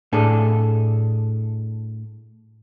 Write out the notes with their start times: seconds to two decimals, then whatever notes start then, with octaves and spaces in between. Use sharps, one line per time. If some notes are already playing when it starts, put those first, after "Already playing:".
0.13 A2 D4 G#4 A4